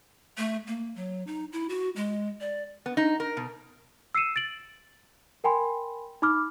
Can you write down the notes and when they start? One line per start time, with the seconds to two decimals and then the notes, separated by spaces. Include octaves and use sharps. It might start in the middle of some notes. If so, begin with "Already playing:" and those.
0.37 A3
0.67 A#3
0.96 F#3
1.27 D#4
1.52 E4
1.69 F#4
1.96 G#3
2.40 D5
2.86 B3
2.97 D#4
3.20 A#4
3.37 B2
4.15 E6 C7 C#7 D#7 E7
4.36 A6 D7 F#7
5.44 A#4 G5 G#5 B5 C6
6.22 D#4 B5 D6 F6